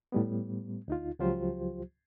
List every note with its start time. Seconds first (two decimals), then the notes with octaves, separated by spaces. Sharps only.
0.12 A2 G3 B3
0.88 D2 D#4 F4
1.19 C#2 F3 F#3 F4 G4 C5